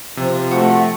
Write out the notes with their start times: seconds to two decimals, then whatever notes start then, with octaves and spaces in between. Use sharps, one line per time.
0.17 C3 F3 C4
0.51 A3 F#4